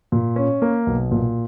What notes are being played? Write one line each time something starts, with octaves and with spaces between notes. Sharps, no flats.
A#2
C#4
A#3
B1
A#2